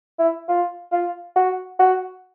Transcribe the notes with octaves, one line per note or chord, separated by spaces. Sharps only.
E4
F4
F4
F#4
F#4